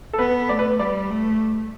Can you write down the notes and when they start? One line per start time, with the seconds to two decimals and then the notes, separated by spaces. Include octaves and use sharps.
0.13 A4
0.19 B3 B4
0.49 A3 D5
0.59 B4
0.79 G3 D5
1.10 A3